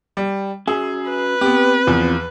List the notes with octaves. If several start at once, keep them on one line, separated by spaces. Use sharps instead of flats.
G3
C#4 F#4 G#4 E5
B4
B3 C4 G4
E2 F3